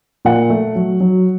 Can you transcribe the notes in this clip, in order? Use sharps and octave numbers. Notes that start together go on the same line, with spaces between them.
A#2 F#5
A3
F#3
F#3